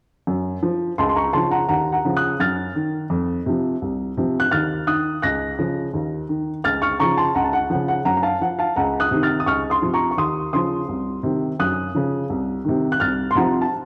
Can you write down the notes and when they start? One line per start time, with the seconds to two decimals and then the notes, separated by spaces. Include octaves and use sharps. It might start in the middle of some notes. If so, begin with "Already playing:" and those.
0.27 F#2
0.63 F3
0.98 C#2 A5 C6
1.09 C6
1.16 A#5 C#6
1.33 C#3 F3 A5 C6
1.51 F#5 A#5
1.69 D#2 F#5 A#5
1.92 F#5 A#5
2.05 C#3 F3
2.17 D#6 F#6
2.40 F#2 F6 A6
2.75 D#3
3.10 F2
3.46 C3 F3
3.82 C2
4.17 C3 F3
4.40 F#6
4.51 D#2 F6 A6
4.87 D#3 D#6 F#6
5.22 C#2 F#6 A#6
5.59 C#3 F3
5.93 D#2
6.29 D#3
6.64 C#2 F6 A6
6.82 C#6 F6
7.00 C#3 F3 A#5 C#6
7.17 A5 C6
7.35 C#2 F#5 A#5
7.44 A5
7.53 F#5
7.70 C#3 F3 F#5
7.88 F#5
8.05 F#2 F#5 A#5
8.17 A#5
8.23 F5 A5
8.41 F3 F#5
8.59 F5 A5
8.76 C#2 F#5 A#5
9.00 D#6 F#6
9.11 C3 D#3
9.23 F6 A6
9.40 D#6
9.46 C#2 C#6 F6
9.70 C6 D#6
9.82 C3 F3
9.94 A#5 C#6
10.11 C#6
10.17 D#2 C6 D#6
10.53 C#3 F3 C6 D#6
10.89 C2
11.23 C3 D#3
11.59 F#2 D#6 F#6
11.95 C#3 F3
12.30 C2
12.65 C3 D#3
12.92 F#6
13.00 C2 F6 A6
13.31 C6
13.35 C3 F3 F#5 A#5
13.61 A5